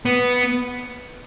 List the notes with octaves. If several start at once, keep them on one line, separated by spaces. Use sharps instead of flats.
B3